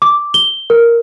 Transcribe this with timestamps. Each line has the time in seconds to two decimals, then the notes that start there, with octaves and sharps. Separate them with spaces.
0.02 D6
0.34 G7
0.70 A#4